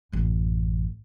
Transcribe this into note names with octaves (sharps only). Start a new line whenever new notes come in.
A1 F#2